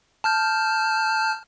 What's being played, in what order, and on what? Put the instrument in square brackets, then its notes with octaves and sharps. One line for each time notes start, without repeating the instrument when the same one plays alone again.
[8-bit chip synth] A5 F6 G6